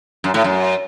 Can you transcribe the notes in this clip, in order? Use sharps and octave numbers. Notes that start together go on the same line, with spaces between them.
F#2
A2
F#2